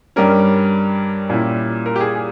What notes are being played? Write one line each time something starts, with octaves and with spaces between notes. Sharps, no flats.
G2 G3 C#4 A#4
A#2 G3 C#4 E4
A#4
G4
G#4
G#4